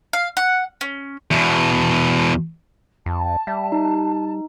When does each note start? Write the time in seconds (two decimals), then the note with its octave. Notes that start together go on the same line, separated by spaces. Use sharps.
0.13 F5
0.37 F#5
0.81 C#4
1.31 E2 B2
3.06 F2 A5
3.47 G3 E5
3.72 D#4